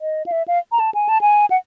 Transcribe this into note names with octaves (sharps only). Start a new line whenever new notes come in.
D#5
F5
E5
F5
A#5
A5
G#5
A5
G#5
F#5